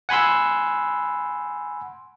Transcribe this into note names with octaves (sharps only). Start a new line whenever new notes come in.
F#5 G#5 B5 C6 E6